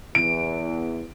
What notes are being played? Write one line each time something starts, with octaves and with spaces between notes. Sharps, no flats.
E2 D7